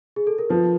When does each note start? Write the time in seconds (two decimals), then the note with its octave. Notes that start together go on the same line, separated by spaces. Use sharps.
0.16 G#4
0.27 A4
0.39 A#4
0.50 F3 B4